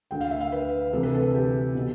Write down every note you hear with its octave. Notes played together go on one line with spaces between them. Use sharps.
D2 D3 G5
F5
E5
F5
B4
D2 C3 E3 A4
B4
A4
G4
B2